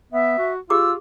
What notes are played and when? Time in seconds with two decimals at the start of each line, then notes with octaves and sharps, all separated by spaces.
0.12 B3 E5
0.38 F#4
0.70 F4 G4 G#4 D6 E6